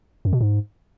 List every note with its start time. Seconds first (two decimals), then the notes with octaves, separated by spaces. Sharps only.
0.25 F#2
0.33 B2
0.41 G#2